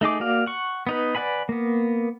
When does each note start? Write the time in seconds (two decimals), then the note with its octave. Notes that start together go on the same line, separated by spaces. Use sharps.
0.01 A3 D#4 G#4 D6
0.20 A#3 F#4 D5 F5
0.46 F#5 C#6
0.87 B3 D#4 B4
1.15 B4 D5 F#5 G#5 B5
1.49 A#3 B3